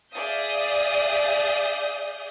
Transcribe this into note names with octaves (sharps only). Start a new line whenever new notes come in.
G#4 D5 E5 F5 D#6 G6